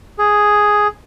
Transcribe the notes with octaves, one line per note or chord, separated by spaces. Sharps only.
G#4